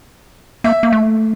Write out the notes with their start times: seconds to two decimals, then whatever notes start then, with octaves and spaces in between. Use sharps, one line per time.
0.64 A#3 E5
0.83 A#3
0.93 A3